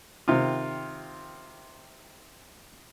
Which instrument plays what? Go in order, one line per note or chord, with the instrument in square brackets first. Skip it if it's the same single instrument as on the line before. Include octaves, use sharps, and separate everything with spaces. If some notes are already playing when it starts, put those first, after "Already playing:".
[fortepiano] C3 D#3 F4